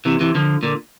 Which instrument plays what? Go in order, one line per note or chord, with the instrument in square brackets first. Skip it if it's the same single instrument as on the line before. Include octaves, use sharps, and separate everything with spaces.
[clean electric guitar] C3 E3
C3 E3
D3 F3
A#2 D3